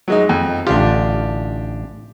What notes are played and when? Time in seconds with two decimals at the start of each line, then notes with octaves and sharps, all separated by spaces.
0.08 F#3 G#3 D#4
0.29 F2
0.67 A1 D3 D4 F4 G4